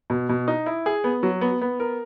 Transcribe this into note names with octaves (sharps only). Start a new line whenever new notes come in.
B2
B2
D#4
E4
G#4
B3
F#3
B3
B3
A#4